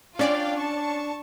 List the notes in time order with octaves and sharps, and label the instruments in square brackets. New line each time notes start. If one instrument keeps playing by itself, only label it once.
[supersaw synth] C#4 D5 [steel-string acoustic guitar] D4 [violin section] F4 F5 G5
[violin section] A5 C#6